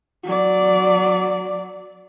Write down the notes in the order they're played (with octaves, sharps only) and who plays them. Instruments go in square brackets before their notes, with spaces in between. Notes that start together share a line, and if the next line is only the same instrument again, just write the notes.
[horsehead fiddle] F#3 D5